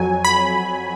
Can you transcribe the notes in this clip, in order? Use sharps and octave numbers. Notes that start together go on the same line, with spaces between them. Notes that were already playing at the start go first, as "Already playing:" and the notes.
Already playing: F2 F#3 G#5
B5